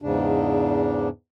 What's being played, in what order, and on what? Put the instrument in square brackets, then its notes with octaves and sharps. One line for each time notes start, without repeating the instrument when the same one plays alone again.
[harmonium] E2 G#2 C#3 D4